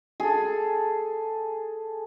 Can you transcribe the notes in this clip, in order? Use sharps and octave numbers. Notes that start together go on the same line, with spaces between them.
G#4 A4